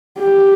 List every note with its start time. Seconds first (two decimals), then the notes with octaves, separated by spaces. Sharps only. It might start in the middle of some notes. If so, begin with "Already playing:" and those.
0.19 G4